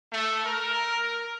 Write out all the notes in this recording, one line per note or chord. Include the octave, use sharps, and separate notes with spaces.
A3
A#4